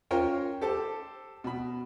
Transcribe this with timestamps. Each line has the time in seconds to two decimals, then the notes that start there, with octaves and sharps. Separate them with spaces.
0.11 C#4 F4 A#4 C5 C#5 G5
0.62 G4 A4 C5
1.44 B2 B5